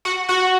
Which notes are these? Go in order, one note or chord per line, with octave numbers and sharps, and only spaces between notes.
F#4 F#5
F#4 F#5